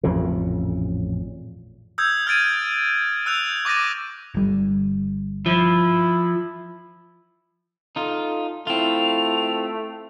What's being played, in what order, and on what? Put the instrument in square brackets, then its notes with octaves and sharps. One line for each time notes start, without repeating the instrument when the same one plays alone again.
[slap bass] A1 F2 A#2 C#3
[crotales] D#6 E6 G6 G#6
F6 G#6 A6 D7 D#7
E6 F#6 G6 F7
C#6 D6 A6 A#6 D#7
[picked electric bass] G1 G3
[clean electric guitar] F3 [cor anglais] E4
[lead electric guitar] D#4 F4 [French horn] A4
[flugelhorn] A3 [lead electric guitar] C4 F4 [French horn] E4 [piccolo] F7